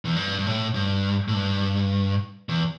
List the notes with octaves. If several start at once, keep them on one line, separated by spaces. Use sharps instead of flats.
E2
G2
G2
A2
G2
A2
G2
E2